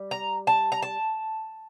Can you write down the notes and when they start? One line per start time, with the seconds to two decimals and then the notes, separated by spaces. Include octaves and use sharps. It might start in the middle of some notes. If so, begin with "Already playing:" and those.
Already playing: G3
0.11 A#5
0.47 A5
0.72 A#5
0.82 A5